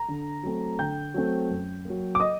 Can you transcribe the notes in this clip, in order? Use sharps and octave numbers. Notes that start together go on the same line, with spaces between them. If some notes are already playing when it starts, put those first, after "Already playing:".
Already playing: A#5
D3
F#3 A3 C4
D3 G5 G6
F#3 A3 C4
F#2
F#3 A#3
D6
D#5 D#6